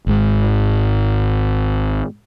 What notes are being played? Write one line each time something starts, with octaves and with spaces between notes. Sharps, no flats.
G#1 G#2